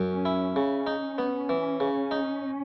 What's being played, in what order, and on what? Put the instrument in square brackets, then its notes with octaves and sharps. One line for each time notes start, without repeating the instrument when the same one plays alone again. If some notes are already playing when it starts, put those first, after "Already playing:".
Already playing: [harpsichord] F#2
[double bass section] C#4
[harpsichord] E4
[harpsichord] C#3 [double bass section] C#4
[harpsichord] D#4
B3
E3
C#3
D#4